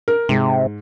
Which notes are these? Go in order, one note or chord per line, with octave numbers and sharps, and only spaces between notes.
A#4
G#2 C3